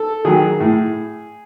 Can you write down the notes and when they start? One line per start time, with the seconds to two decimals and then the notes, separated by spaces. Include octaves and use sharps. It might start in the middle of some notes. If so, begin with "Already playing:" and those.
Already playing: A4
0.25 D#3 F#3 G#4
0.60 A2